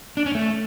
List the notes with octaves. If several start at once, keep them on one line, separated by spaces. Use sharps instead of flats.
D4
C#4
A3